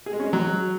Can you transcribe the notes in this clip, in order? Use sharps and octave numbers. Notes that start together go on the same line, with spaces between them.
G#4
G#3
C#4
G#3
F#3